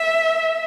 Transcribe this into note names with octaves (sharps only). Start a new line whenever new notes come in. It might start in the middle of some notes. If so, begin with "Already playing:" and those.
Already playing: E5